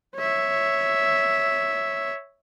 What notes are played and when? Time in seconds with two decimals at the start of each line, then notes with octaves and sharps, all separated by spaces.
0.16 C#5 E5